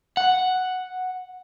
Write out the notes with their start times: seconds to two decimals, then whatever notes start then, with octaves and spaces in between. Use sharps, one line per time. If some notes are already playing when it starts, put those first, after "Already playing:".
0.17 F#5